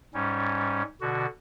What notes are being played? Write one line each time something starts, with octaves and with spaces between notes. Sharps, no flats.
G#2 G3 C#4
B2 D3 F#4